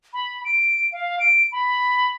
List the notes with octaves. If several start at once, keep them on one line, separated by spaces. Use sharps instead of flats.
B5
D7
F5
D7
B5